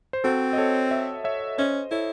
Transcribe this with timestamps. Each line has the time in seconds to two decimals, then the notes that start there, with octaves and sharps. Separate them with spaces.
0.13 C5
0.24 C4 F#4 A4
0.53 D#5
0.58 A4 C#5
0.91 C#5 E5
1.24 C#5 E5
1.58 C#4 C5 D#5
1.91 E4 A4 C#5